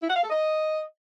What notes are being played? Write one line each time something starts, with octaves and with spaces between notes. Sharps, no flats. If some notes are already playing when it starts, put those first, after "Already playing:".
E4
F#5
F5
A4
D#5